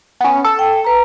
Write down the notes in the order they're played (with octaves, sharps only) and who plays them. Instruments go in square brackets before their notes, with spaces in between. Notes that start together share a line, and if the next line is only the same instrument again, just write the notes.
[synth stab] B3 C#4
A4
[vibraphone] G5
B4 A#5